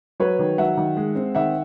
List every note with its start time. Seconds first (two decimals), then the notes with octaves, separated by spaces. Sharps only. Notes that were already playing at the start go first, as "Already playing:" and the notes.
0.20 F#3 B4 C#5
0.39 D#3
0.58 F#3 E5 F#5
0.77 D#3
0.97 G#3
1.15 C4
1.35 D#3 E5 F#5